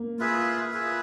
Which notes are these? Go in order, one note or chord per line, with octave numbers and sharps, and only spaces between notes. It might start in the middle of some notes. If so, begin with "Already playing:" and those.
Already playing: A#3
F4 G#4 B4 E5
F4 G#4 B4 E5